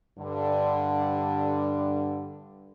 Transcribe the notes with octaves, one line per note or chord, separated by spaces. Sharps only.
G2 D3